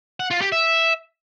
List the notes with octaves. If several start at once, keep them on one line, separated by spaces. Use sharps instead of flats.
F#5
F4
G4
E5